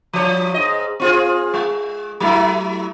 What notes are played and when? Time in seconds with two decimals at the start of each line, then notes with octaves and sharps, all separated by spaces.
0.13 F3 C#5
0.54 G#2 D#5
1.00 C4 F4 G#4
1.54 G#3
2.20 F#3 A3 E4